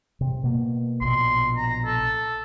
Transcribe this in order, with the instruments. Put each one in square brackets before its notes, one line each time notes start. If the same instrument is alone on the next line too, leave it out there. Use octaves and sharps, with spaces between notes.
[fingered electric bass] C3
B2 A#3
[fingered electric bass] A#1 B2 [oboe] C6
[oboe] A#5
A4